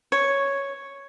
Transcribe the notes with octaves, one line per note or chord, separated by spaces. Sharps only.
C#5